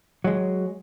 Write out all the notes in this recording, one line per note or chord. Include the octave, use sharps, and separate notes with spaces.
F#3 G#3